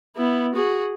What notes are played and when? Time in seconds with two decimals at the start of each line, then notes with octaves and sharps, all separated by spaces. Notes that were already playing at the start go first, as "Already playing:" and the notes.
0.16 B3 E4
0.54 F#4 G#4